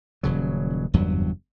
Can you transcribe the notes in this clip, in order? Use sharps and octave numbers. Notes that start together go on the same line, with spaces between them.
D#1 C#3 F#3
F#1 E2 G2 F#3